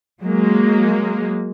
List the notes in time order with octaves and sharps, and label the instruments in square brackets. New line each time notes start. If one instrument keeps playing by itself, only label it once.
[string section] F#3 G#3 A#3